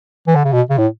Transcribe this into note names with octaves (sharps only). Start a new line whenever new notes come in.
E3
D3
C#3
B2
C#3
A2